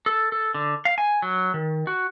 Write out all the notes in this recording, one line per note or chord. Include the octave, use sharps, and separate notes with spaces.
A4
A4
D3
F5
G#5
F#3
D#3
F#4